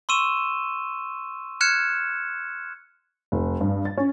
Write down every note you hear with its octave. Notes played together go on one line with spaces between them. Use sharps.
C6 C#6 E6 D#7 E7 G7
F6 F#6 G#6 C#7 E7
F1
G2
A6
C#4